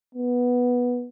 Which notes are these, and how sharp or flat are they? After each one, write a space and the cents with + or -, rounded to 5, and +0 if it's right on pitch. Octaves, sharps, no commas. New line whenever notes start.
B3 -10